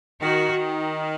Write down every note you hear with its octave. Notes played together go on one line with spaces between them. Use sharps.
D#3 F#4